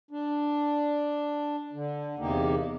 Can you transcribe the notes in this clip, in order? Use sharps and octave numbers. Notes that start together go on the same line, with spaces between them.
D4
D3
E2 C3 A#3 D#4 G4